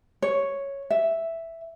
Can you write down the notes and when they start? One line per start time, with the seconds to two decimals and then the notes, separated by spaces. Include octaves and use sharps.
0.22 C#5
0.90 E5